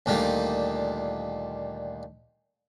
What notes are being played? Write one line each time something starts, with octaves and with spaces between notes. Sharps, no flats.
D2 A#2 D#3 G3